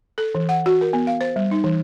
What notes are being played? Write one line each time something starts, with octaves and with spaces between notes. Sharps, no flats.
A4
E3
F#5
F#4
A#4
B3
F5
C5
G3
D#4
E3